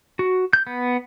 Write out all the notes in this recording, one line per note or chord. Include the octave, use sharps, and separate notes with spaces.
F#4
G6
B3